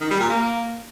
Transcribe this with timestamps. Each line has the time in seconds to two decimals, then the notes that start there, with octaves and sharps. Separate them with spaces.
0.01 D#3
0.10 G3
0.20 A#2
0.29 A#3